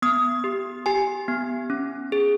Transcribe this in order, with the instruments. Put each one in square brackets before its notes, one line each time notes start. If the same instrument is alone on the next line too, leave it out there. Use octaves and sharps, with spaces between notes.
[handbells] B3 D#6
G4
G4 G#5
B3
C#4
G#4